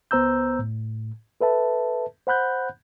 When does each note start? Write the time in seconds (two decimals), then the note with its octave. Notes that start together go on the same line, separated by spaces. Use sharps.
0.11 C#2 B3 C5 A#5 E6 G6
0.59 A2
1.41 A4 B4 E5 A5
2.27 C5 F#5 B5 F#6 G6